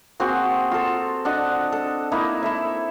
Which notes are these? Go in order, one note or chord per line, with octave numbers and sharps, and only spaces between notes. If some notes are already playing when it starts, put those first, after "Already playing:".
A#3 C4 F#4 G#4
F4 A4
D4 D#5 F#5
A4
A#3 D#4 E4
E4 A4 E5